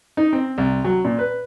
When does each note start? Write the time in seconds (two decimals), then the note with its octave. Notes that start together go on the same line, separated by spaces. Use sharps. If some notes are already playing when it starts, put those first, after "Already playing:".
0.17 D#4
0.33 C4
0.58 C2
0.84 F#3
1.05 A#2
1.19 B4